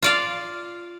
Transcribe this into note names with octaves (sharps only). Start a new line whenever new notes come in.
F4 D5 F5